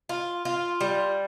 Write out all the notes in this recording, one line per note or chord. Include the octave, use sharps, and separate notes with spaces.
F4
F4
G3